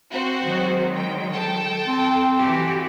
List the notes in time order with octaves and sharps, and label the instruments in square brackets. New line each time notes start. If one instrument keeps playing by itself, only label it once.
[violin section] C4 F#4 C5
[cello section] D#3 F#3 G#3
[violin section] G5
A4 G5 A5
[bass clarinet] C4
[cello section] E3 F#4 G4